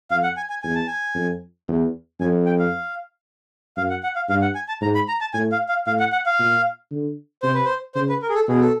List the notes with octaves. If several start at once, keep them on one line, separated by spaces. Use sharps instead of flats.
F2 F5
F#5
G#5
G#5
E2 G#5
A5
G#5
F2
E2
F2 G#5
G5
F5
F#2 F5
F#5
F#5
F5
G2 F5
F#5
G#5
A5
G#2 A#5
B5
A#5
A5
A2 G#5
F5
F5
A2 F5
F#5
F#5
F5
A#2
D3
C3 C5
B4
C5
C#3 C5
B4
A#4
G#4
A4
B2 G#4
A4